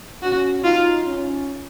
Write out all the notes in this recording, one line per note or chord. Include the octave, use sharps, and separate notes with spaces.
C#4 F#4
D#4 F4
C#4